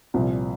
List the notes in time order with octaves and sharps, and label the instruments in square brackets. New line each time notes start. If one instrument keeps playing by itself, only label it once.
[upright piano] C2 A#2 F3